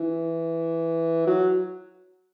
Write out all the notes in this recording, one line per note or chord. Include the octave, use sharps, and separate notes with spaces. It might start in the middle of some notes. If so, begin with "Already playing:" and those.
Already playing: E3
F#3